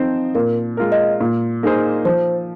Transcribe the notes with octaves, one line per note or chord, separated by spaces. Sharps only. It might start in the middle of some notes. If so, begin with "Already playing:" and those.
Already playing: F3 C4 D#4 C5
A#2 A#4
G#3 F4 A#4
D#5
A#2
A#3 D#4 G#4 C5
F3 C5